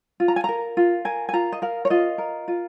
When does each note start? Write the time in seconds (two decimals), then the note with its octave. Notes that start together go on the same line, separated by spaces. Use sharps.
0.20 F4
0.28 A#5
0.36 G#5
0.44 A#4 A#5
0.77 F4
1.05 A#4 G#5
1.29 G#5
1.33 F4 A#5
1.52 D#5
1.62 A#4 F5
1.85 C#5
1.90 F4 D#5
2.18 A#4
2.48 F4